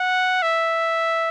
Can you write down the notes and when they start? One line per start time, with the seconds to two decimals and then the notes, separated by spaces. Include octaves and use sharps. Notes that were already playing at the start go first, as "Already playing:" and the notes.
Already playing: F#5
0.42 E5